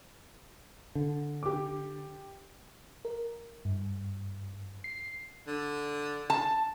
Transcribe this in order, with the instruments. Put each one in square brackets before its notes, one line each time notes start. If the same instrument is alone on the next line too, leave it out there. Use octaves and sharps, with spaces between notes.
[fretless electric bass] D3
[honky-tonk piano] G4 D6
[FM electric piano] A#4
G2
C7
[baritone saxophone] D3
[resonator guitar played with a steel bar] A5